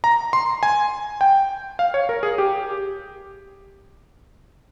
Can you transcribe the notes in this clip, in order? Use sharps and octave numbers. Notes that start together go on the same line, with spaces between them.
A#5
C6
G#5
G5
F5
C#5
A#4
G#4
G4